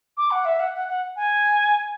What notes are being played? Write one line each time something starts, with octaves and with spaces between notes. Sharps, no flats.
D6
F#5
E5
F#5
F#5
F#5
G#5